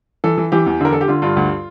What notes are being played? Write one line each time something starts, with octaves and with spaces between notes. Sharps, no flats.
E3 A4
E3
E3 G4
E2
D3
A#4
D3 A4
G4
D3 F4
G2 F4
D2